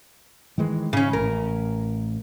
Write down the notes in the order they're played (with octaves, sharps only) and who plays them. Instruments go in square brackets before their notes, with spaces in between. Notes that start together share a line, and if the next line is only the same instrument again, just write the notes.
[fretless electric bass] D#3 E3 G#3
[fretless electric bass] G#2 [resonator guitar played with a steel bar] C#3 C#4
[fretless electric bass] A1 [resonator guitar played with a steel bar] A#4